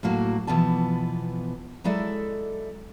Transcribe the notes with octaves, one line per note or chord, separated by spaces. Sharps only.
A2 F#3 A#3 F#4
B2 E3 F3 B3 A5
F#3 G#3 E4 A4 D5 E5